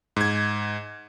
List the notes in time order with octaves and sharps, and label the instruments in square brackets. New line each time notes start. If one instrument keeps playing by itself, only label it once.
[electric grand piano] G#2 G#6